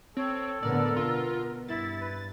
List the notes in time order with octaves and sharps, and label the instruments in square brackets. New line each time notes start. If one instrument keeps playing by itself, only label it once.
[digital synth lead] C4 [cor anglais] A4 [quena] C#5
[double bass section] A2 D3 B3 [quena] A#4 [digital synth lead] D5
[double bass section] B2 B3 [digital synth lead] F4
[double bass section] G2 [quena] E4 [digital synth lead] A6
[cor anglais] B4